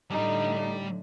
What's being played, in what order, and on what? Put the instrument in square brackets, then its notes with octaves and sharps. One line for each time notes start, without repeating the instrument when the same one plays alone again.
[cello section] A2 D3 [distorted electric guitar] G3 [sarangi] D#4